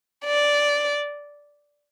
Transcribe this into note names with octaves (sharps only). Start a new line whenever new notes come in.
D5